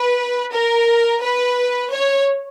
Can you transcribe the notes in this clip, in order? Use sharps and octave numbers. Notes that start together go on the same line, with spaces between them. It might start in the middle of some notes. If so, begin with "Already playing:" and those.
Already playing: B4
A#4
B4
C#5